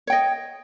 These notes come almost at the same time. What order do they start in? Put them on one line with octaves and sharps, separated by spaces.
C#5 G5 D#5